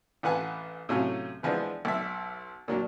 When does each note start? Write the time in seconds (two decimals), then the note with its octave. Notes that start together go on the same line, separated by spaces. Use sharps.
0.23 A1 F4 B4 F#5 G#5
0.89 A2 C3 F#3 C#4 F4
1.43 E3 F3 G#3 B3 D4
1.85 B1 E5
2.68 A#2 F#3 D4